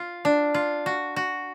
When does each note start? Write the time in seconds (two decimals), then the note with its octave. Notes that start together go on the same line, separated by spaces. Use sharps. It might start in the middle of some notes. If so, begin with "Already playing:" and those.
Already playing: F4
0.25 D4
0.54 F4
0.86 F#4
1.16 F#4